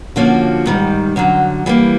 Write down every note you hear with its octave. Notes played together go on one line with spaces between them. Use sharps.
D3 F3 A#3 C#4 F#4
G#2 D#3 G3
F#2 D3 F#3
E3 G3 A#3